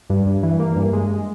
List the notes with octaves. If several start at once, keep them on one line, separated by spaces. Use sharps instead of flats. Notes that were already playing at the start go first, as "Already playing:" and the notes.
G2
G2
E3
A#3
G2
G#3